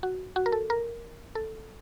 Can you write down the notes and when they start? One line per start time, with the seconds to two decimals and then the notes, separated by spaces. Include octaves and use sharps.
0.03 F#4
0.36 F#4
0.46 A#4
0.52 A4
0.70 A#4
1.35 A4